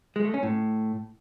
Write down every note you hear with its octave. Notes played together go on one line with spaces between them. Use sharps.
G#3
A3
C#4
A2